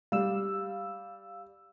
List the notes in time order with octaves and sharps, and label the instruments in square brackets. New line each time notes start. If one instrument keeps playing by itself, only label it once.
[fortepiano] G3 [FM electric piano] F5 E6